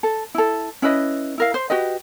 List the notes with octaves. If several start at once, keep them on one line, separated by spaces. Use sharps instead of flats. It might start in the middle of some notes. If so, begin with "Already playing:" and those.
A4
E4 A4
C#4 E4 B4 D#5
E4 A#4 F5
C5
F#4 G4 B4 D#5